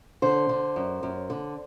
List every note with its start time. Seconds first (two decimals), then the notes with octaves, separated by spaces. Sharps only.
0.22 D3 C5
0.49 D3
0.76 F#2
1.03 F#2
1.30 D3